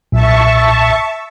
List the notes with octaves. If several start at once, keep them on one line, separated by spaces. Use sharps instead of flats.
B1 A#2 E5 A5 C#6